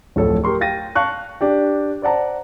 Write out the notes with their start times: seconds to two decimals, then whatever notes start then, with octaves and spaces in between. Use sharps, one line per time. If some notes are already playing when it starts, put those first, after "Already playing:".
0.16 D1 F2 A4 C#5
0.44 G4 A#4 C6 C#6
0.61 F5 G5 A6 A#6 D#7
0.95 F5 A5 C#6 F#6
1.41 D4 G4 G5
2.02 C5 D5 F#5 A5 A#5